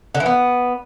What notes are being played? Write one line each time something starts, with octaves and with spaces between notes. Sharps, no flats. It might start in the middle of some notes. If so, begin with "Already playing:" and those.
D3
E3
B3